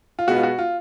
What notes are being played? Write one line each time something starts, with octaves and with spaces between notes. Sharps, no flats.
F4
B2 G#3 B3 F#4
F4
F#4
F4